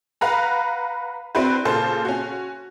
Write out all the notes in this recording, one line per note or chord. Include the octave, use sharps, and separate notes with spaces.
B4 F5 F#5 A#5 B5
C4 D4 E4 F#4 B4 C5
A#2 C#3 A4 C5 A5
C#4 F#4